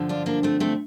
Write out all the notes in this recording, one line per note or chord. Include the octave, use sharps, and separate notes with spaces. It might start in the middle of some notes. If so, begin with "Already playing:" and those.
Already playing: G2 D3 F3
D4 F4
A#3 D4
A3 C4
A3 C4